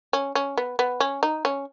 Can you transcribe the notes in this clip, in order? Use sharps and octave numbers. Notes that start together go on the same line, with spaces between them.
C#4
C#4
B3
B3
C#4
D#4
C#4